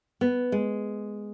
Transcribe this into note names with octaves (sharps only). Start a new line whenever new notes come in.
B3
G#3